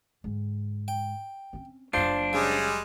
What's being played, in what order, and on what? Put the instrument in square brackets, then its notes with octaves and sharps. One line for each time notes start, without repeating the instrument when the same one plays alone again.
[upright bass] G#2 D3
[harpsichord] G5
[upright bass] C4 C#4
[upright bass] F#1 F#2 [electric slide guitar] D4 C5 [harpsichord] F4
[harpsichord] C#3 [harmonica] G3 G#3 G#4